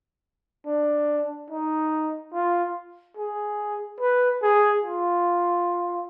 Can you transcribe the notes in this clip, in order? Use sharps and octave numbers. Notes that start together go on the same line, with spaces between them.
D4
D#4
F4
G#4
B4
G#4
F4